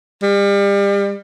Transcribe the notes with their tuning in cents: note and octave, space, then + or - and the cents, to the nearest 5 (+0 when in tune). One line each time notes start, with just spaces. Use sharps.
G3 +35